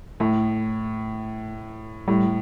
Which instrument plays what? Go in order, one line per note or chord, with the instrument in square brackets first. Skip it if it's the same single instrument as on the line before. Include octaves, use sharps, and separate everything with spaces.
[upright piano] A2 [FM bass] A3
[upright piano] A2 [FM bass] G3